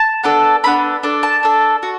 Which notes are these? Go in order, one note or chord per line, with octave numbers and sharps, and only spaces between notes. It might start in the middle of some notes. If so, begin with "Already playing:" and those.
Already playing: A5
B3 D4 A4
B3 D4 A4 B5
D4 A4
A5
D4 A4
F#4